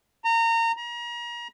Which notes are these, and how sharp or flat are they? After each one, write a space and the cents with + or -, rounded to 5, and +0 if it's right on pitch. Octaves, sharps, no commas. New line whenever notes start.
A#5 -25
A#5 +35